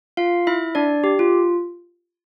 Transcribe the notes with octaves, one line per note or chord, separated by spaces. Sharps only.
F4 F5
E4 E5
D4 D5
G4
F4